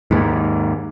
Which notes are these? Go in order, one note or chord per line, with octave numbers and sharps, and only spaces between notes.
D#2 G#2